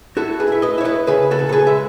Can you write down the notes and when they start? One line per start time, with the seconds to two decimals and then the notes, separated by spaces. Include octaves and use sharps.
0.17 E4 F#4 A4
0.40 G#4 B4
0.48 E4 E5
0.62 B4 D#5
0.78 E4 C#5
0.85 B4 D#5
1.07 C#3 G#4 B4
1.31 F#4 A4
1.39 C#3
1.49 A4
1.52 G#4 B4
1.67 G#3 E5